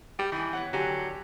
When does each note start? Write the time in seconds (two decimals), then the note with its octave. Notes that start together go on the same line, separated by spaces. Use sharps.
0.19 G3 G5
0.32 D#3 E3 G#5
0.53 B3 C#5 F#5
0.73 D3 F#3 G4 G#5